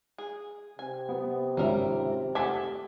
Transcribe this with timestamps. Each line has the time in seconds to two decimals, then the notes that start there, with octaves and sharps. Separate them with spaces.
0.18 G#4
0.79 C3 G#5
1.09 B3
1.57 G#1 C#2 G3 C#4 E4 A#4 E5
2.35 A3 G4 A4 F#5 G#5 D6 B6